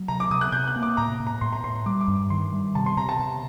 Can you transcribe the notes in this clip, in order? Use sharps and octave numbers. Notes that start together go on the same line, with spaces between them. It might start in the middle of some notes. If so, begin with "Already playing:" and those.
Already playing: F#3
C3 A#5
D6
C3 D#6
F#6
C3 G6
F#6
A#3
D6
A2 A#5
A2
A#5
A2 C6
A#5
A2 C6
G3 D6
D6
G2
D#3 C6
G3
C3 A5
C6
C3 A#5
A5
C3